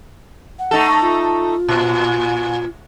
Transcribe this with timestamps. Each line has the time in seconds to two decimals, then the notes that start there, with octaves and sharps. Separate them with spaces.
0.59 F#5
0.71 A3 D#4 A4
1.02 F4
1.68 A#2